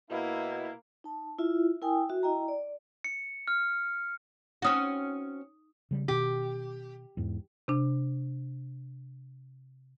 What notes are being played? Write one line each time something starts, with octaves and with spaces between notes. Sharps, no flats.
B2 A#3 E4
D#4 A5
E4 F4 E5
E4 A#4 G5 G#5 D#6
F#4 E5
E4 D#5 G5 A#5
D5
C#7
F6
C4 C#4 D#4 F#4 D#6
C#3 G3
B2 D#3 G4
E2 G#2
C3 D4